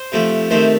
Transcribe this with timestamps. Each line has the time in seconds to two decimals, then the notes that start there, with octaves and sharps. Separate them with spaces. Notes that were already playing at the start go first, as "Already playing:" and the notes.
Already playing: C5
0.12 C3 F3 A3
0.50 C3 D#3 A3 C5